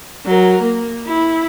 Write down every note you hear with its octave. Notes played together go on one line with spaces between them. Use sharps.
F#3 A#4
A#3
E4